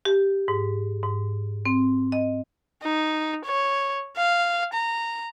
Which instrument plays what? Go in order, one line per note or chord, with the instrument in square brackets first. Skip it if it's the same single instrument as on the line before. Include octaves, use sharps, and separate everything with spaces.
[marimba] G4
G#2
G#2
C4
D#5
[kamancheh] D#4
C#5
F5
A#5